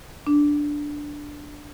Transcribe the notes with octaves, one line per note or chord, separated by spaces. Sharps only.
D4